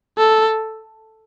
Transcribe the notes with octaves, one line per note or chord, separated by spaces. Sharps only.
A4